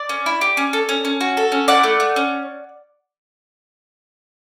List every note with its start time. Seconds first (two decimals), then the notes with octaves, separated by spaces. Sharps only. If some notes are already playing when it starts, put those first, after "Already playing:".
Already playing: D5
0.09 C#4
0.26 E4
0.41 G4
0.57 C#4
0.73 A4
0.89 C#4
1.05 C#4
1.21 F#4
1.37 A4
1.52 C#4
1.68 E4 D5 F#5
1.83 A3
2.00 A3
2.16 C#4